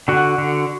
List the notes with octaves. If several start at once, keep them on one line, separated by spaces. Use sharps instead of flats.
D3 F#4
D3